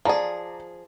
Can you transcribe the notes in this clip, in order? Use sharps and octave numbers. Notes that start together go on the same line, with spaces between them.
F3 G#4 D5 A5 A#5